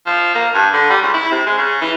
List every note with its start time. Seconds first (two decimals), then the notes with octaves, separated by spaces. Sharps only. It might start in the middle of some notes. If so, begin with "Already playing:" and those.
0.06 F3
0.35 A#3
0.54 G2
0.73 D3
0.90 G3
1.02 C#2
1.14 E4
1.32 C3
1.46 G#3
1.58 C#3
1.81 E3